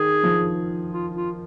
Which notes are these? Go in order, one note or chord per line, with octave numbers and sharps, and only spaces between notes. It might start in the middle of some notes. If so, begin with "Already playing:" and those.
Already playing: D#3 G#4
F3
F4
F4